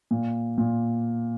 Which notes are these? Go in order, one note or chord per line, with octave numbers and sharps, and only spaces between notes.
A#2
A#2